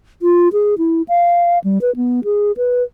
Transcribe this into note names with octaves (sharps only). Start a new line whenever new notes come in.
F4
G#4
E4
F5
G3
B4
B3
G#4
B4